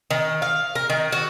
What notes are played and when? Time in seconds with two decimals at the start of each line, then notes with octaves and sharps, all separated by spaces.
0.11 D#3
0.42 F5
0.75 A#4
0.90 D#3
1.12 F#4